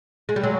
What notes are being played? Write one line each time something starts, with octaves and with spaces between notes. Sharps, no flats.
G#3
G3
F#3 G#3